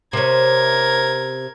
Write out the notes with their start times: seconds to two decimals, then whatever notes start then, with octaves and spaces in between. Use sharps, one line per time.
0.13 C3 C#4 A#4 G#6